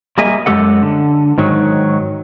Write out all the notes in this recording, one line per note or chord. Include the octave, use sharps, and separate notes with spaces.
G3 A#3 G#4 D#5 E5 G#5
F#2 G#3 G4 A4 F#5
D3
G#2 D#3 F#3